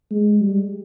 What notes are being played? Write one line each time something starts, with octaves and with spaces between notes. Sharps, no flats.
G#3
G3